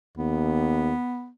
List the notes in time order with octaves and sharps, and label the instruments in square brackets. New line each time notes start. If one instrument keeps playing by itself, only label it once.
[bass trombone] D#2 [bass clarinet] B3